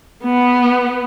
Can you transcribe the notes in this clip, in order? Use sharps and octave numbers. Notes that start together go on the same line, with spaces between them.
B3